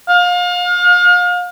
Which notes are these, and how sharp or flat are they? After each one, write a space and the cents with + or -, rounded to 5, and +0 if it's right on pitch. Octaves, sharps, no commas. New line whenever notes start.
F5 +35